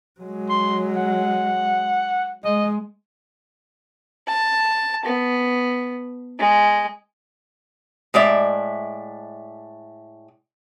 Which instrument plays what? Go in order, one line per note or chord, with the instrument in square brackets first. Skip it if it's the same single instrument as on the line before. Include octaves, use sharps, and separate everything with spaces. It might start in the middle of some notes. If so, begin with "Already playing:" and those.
[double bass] F#3 G#3
[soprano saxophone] C6
F#5
[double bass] G#3 [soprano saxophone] D#5
[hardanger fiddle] A5
B3
G#3
[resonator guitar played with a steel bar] A2 G#3 D5 E5